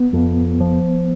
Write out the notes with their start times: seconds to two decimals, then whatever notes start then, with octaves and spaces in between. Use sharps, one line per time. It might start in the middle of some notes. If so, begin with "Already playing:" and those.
Already playing: B3
0.13 F2
0.60 F3